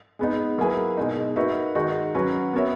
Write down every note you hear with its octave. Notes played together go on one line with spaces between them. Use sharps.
G#3 B3 D#4
F#3 A#3 E4 G#4 B4
B2 G#3 D#4
A#3 D#4 F#4 B4 E5
D#3 G#3 D#4 F#4
F#3 C#4 F#4 B4
B3 F#4 A#4 C#5 E5